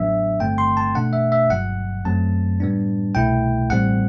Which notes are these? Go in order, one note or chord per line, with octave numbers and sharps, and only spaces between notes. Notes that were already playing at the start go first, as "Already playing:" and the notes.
Already playing: A1 A2 F#3 B3 D4 E5
G1 G2 D3 A3 C4 G5
C6
A5
B2 A3 D4 F#5
E5
E5
G1 G2 F#3 F#5
F#2 F#3 A3 C4 A5
A2 G3 B3 D4
C2 B2 A3 E4 G5
A1 A2 G3 C4 F#5